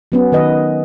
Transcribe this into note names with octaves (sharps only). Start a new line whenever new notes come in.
F#3 B3 C#4
D#3 B4 D#5